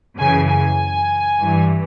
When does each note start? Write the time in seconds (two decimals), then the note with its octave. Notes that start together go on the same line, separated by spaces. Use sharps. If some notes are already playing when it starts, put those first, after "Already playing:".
0.19 F#2 C#3 E3 G#5
0.49 G#5
1.41 G2 E3